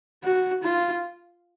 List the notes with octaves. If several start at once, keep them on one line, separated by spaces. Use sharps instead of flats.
F#4
F4